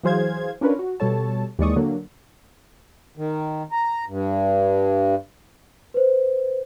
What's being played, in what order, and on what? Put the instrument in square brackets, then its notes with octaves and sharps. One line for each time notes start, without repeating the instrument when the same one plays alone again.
[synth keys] E3 F#3 G#4 C5 F5 G#6
C#4 D4 F4 A#4 B4 C#5
F#4
B2 G3 A4 C#5 A5
D#2 E3 G#3 D5 C#6 D#6
D3 F#3 A#3
[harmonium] D#3
A#5
G2
[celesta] B4 C5